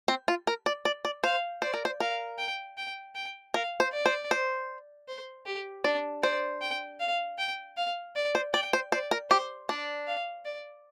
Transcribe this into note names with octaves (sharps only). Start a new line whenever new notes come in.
C4
F4
A#4
D5
D5
D5
C5 F5
C5 D5
A#4
C5
A#4 F5
G5
G5
G5
A#4 F5
C5
D5
C5
C5
C5
G4
D4 D5
C5 D5
G5
F5
G5
F5
D5
C5
D5 G5
C5
C5 D5
A#4
G4 C5
D4 D5
F5
D5